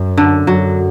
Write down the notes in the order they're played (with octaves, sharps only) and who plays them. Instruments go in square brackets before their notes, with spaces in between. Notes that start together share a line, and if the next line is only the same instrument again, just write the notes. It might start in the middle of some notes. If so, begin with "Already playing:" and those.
Already playing: [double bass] F#2
[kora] D3
[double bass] F#2 [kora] F#3